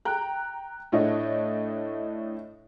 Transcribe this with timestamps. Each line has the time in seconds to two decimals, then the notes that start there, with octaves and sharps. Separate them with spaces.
0.05 G5 A#5 F#6
0.92 A2 A3 D4 C#5 D#5